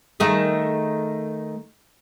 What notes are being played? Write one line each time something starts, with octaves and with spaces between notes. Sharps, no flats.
D#3 A3 G#4